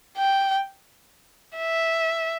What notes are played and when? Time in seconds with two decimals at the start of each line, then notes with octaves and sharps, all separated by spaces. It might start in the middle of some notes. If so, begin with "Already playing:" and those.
0.17 G5
1.57 E5